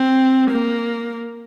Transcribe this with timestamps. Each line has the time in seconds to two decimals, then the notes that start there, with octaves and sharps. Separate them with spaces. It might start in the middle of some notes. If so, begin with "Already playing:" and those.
Already playing: C4
0.51 A#3